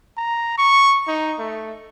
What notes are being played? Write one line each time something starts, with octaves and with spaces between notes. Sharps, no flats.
A#5
C#6
D#4
A3